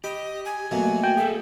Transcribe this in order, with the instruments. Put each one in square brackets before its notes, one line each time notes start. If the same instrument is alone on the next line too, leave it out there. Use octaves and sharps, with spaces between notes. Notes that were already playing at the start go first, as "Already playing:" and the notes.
[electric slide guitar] G4 [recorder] D#5 [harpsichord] B5
[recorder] G#5
[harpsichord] B2 A3 A#3 [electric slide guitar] F#3
[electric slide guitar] F#4 [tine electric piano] G5
[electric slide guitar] G#4 A4 [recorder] E5